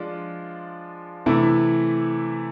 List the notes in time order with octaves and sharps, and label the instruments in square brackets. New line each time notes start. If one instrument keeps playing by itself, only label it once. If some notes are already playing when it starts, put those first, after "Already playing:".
Already playing: [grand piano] F3 G#3 D4 F4
C3 E3 A3 E4